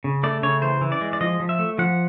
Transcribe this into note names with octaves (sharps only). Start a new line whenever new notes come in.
C#3
A3 D5
C#3 C#5
E3 C5
E3
D5
G#3
D5
F3 D#5
F3
E5
A3
F3 F#5